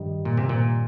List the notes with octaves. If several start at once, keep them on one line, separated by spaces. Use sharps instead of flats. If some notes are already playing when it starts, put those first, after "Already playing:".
Already playing: G2 D#3 G3 D#4
A#2
C3
A#2